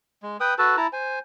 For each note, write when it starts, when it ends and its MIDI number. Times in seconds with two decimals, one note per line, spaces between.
0.23 0.37 56
0.40 0.54 71
0.40 0.54 79
0.40 0.54 87
0.58 0.76 66
0.58 0.76 69
0.58 0.76 71
0.58 0.76 81
0.77 0.87 64
0.77 0.87 81
0.77 0.87 82
0.93 1.19 72
0.93 1.19 80